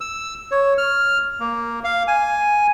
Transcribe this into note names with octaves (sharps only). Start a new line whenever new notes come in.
E6
C#5
F6
A#3
F5
G#5